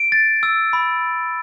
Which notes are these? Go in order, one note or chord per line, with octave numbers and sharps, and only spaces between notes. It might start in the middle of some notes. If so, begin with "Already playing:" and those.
Already playing: D7
A6
E6
B5